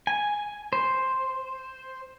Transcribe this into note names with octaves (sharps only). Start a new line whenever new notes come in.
G#5
C5